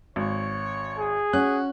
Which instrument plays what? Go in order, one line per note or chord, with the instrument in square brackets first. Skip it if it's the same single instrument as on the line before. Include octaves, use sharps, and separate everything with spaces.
[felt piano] G#1 [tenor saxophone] C#5
[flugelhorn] G#4
[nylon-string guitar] C#4 [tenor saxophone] F#4 [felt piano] F#6